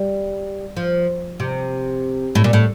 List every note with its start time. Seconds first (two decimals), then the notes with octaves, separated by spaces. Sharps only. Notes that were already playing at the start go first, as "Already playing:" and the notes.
Already playing: G3
0.77 F3
1.40 C3
2.35 A2
2.44 A#2
2.53 A2